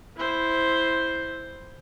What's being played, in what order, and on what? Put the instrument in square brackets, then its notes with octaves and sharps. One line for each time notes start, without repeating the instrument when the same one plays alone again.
[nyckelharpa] E4 C5